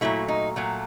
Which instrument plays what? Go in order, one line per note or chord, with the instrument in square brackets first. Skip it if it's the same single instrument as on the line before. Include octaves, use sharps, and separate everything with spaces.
[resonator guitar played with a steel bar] A#2 F#3 A3 E4
D#4
A#2 F#3 A3